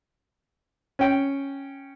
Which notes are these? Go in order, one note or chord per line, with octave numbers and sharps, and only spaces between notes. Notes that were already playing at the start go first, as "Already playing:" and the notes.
C#4 G5